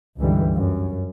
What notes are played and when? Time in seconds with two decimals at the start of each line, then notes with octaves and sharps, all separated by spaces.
0.18 C#2 G2 D3 E3 G3
0.54 F#2